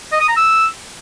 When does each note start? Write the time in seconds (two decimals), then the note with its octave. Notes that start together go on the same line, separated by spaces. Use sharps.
0.12 D#5
0.20 D#6
0.28 A#5
0.36 E6